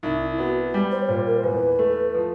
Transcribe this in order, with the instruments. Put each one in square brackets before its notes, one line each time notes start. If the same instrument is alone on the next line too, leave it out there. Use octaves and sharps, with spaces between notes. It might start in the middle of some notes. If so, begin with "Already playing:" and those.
[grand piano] C2 [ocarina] D#4
[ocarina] E4
[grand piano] B3 [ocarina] F#4
[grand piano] G3
[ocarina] C5
C#5
[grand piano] A#2 [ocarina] C5
[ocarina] A#4
C5
[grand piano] E2 [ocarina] B4
[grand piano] A3
F3